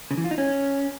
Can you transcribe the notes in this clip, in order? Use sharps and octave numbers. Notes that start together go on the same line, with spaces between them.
C#3
E3
F4
D#4
C#4